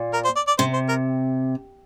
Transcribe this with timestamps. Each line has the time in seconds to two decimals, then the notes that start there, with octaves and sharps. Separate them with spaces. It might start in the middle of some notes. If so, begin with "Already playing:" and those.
Already playing: A#2
0.13 A#4
0.25 C5
0.36 D5
0.47 D5
0.59 C3 C5
0.73 C5
0.89 A#4